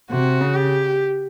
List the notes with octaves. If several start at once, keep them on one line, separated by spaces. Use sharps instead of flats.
C3 F#4
C#3
G4